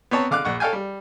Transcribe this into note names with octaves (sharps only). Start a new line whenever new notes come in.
B3 C4 C#5 A5 A#5
D3 F5 D6 F6 F#6
A#1 F#5 C#6
A4 C#5 F5 G5 G#5
G3